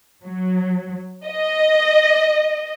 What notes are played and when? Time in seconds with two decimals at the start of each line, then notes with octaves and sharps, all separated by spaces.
0.24 F#3
1.25 D#5